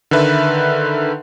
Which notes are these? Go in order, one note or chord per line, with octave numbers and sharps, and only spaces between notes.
D3 D#3 A4 B4 E5